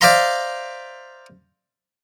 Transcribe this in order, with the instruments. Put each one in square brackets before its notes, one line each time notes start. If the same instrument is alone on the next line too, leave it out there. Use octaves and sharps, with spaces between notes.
[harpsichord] C5 D5 E5 F5 A#5 C6